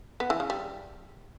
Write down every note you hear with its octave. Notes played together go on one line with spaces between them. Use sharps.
B3
E3
C#3
G3